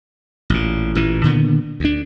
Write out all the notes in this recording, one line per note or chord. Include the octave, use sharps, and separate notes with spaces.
A1 A#2
A1 A#2 E3
A#2 D3 D#3 B3
D2 D4